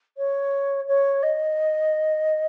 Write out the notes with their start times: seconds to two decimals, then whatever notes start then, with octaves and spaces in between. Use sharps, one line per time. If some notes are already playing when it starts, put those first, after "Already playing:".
0.17 C#5
0.88 C#5
1.23 D#5